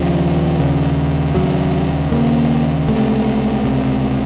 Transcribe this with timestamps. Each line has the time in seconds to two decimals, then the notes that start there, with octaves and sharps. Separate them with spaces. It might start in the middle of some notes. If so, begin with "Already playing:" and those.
Already playing: D#2 C#3 F3
0.59 D#2 C#3
1.35 D#2 C#3 F#3
2.11 D#2 C#3 A#3
2.88 C#2 C3 A3
3.64 C#2 C3